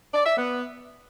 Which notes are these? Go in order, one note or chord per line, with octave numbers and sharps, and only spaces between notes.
D5
E5
B3